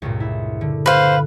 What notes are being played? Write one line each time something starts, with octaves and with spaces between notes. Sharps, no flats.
C#2 G2 A#2
E4
D3
B4 C5 F5